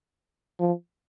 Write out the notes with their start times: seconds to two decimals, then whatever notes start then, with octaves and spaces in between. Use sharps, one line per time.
0.60 F3